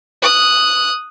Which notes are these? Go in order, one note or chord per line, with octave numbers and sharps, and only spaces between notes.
D#6 F#6